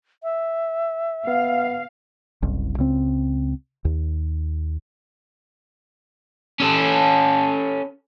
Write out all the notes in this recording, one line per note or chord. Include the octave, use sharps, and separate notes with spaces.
E5
B3 F5
F#1 C2
C#2 C#3 C4
D#2
C#4 A4